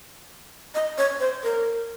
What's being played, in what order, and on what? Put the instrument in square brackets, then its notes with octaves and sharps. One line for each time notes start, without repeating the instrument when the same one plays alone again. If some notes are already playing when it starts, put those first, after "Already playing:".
[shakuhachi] D#5
C#5
C5
A#4